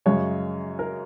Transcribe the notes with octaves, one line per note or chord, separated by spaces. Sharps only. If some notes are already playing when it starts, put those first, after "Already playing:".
F#2 C#3 G#3 C#5
A#4